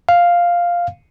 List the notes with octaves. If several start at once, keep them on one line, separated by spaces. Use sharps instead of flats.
F5